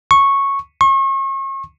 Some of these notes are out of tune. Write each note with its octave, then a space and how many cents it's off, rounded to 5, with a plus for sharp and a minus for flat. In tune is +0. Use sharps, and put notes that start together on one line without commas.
C#6 -10
C#6 -40